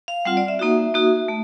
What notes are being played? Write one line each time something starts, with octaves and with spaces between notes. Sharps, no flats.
F5
G3 C4 F4 F#5
D5
E5
A#3 D#4 F#4 E5
A#3 D#4 F#4
A3